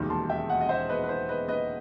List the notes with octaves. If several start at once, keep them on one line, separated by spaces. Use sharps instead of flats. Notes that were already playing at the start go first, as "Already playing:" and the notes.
Already playing: E1 D#2 D#3 G3
A5 C6
E5 G5
D#5 F#5
D#5
C5 E5
B4 D#5
B4
C5
B4 D#5
B4 D#5